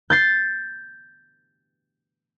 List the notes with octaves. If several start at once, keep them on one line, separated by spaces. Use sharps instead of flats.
G6 A6 C7